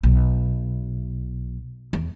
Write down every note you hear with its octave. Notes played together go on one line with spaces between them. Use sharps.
B1
E2